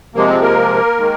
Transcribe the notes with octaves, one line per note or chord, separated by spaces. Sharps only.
C3 F3 G#3 A#3
C4
A#3 A#4
D#3 G#3